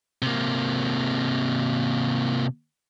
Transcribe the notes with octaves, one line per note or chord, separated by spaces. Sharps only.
C3 A#3